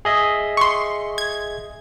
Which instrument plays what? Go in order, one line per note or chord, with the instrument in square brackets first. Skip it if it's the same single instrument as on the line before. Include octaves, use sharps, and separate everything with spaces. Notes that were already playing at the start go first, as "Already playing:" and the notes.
[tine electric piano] G#4 D#5 E5
[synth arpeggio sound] C6 C#6
G#6